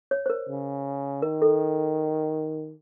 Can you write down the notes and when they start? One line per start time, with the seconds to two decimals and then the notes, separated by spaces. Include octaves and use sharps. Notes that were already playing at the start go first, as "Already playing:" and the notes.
0.11 C#5
0.26 C5
0.30 A#4
0.49 C#3
1.22 D#3 A#4
1.42 A4